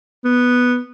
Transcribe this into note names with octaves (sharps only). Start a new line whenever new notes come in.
B3